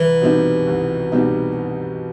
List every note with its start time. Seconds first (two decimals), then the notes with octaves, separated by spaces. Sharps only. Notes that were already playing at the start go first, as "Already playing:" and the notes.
Already playing: C2 E3
0.22 B2 G3 C4 D#4
0.68 C2
1.12 B2 G3 C4 D#4